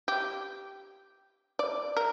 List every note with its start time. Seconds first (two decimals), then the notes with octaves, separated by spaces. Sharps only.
0.08 G4
1.59 D5
1.97 A#4